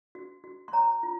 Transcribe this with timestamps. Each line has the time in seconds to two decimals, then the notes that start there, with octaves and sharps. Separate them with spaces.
0.15 F#4
0.44 F#4
0.68 C6
0.73 C#5 A#5
1.03 F4